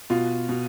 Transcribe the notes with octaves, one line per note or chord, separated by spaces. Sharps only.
B2 F4
B2